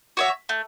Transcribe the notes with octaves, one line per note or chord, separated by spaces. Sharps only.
F#4 C#5 E5
A3